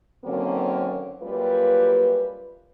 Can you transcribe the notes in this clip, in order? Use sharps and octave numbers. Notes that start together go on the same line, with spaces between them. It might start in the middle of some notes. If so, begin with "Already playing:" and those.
D3 D#3 F#3 A#3 C4 C#4
F#2 G3 A#3 F4 B4